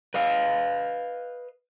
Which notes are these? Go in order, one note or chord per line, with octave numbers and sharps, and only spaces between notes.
B4 D#5 F5